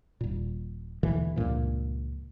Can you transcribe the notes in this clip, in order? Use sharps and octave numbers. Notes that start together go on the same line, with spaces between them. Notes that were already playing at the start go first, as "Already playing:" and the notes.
D#1 A#2
D#2 B2 D3 E3
C#2 G2 A#2 F3